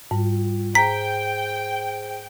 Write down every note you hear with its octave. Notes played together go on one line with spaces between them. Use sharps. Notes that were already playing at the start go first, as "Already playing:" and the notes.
G#2 G3 F4
G#4 C5 G5 G#5 A#5 B6